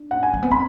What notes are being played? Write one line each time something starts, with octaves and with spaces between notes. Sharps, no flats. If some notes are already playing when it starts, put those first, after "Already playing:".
Already playing: D4
F#5
G#5
A3
B3
C#4 B5